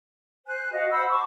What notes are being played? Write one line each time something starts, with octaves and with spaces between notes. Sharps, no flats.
C5 G#5 F#6
F#4 D#5 F5
C5 F#5 B5 E6
A5 C#6 D6